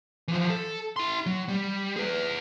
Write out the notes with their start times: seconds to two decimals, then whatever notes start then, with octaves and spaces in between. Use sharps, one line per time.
0.28 E3 F3
0.50 A4
0.96 E4 C6
1.26 F#3
1.48 G3
1.96 G#4 B4